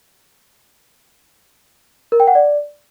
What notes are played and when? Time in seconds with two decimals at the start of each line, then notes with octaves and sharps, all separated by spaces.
2.12 A#4
2.20 G5
2.27 F#5
2.35 D5